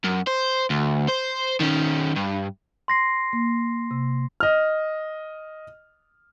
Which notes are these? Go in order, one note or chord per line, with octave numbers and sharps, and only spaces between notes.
F#2
C5
D2
C5
D#3 C#4
G2
C6 A#6 C7
A#3
C3
D#5 F6